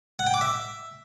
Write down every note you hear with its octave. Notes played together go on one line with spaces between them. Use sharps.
F#5
G5
D6
E5